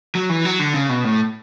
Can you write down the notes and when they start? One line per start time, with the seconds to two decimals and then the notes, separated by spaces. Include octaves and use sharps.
0.15 F#3
0.29 E3
0.45 F#3
0.60 D3
0.74 C#3
0.89 B2
1.04 A2